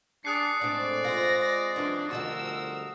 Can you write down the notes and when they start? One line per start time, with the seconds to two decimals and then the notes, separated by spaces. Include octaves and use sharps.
0.25 D4 G#4 D5 D#6 F#6 C7 C#7
0.62 A2 G#3 C4 D4 D5
1.05 C4 F4 A#6
1.76 F#2 E3 D4 F4
2.11 D2 F3 G3 F#4 A#4 D#5 E6